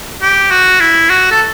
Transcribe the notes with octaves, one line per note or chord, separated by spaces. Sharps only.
G4
F#4
E4
F#4
A4